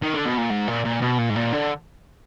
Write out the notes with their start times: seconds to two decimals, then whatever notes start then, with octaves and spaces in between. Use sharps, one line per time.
0.02 D#3
0.14 D3
0.25 B2
0.38 A#2
0.50 G#2
0.67 A#2
0.84 A#2
1.01 B2
1.18 A#2
1.30 G#2
1.35 A#2
1.53 D3